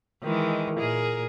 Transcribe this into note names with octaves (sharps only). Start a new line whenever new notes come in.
D#3 E3 G#3
A#2 G#4 A#4